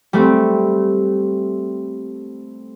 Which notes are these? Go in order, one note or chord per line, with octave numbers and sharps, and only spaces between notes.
G3 A3 C4